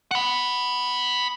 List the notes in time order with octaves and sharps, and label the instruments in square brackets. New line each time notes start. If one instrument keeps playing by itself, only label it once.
[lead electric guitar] F#5 B5